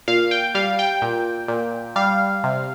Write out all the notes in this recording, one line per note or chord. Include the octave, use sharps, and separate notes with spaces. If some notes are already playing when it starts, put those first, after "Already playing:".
A#2 F5
G5
G3 F5
G5
A#2
A#2
G3 F5
C3